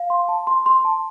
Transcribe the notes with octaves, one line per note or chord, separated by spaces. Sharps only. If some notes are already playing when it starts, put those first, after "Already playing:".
Already playing: F5
C6
A5
C6
C6
A5